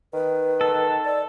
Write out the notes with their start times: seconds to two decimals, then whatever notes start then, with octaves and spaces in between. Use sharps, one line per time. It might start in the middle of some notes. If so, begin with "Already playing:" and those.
0.14 D#3 B4
0.61 A4
1.05 D5